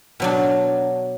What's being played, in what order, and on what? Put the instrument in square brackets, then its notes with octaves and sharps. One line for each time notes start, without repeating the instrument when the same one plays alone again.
[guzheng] B2 F#3 D4